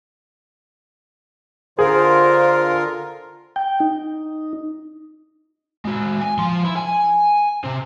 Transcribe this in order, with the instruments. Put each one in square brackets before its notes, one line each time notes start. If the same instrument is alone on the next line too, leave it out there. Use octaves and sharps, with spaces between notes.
[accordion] D3 F4 A#4 [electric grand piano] G#4 [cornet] C5
[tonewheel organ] G5
D#4
[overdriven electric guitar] G#3 F#4
G#5
F3 C6
E4
G#5
C3 C4